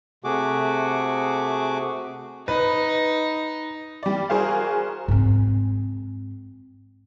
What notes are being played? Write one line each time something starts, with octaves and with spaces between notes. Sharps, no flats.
C3 A3 F#4 G#4 D6
D#4 B4
G3 D5
F#4 G#4 A#4 C5 F5
G#2 C4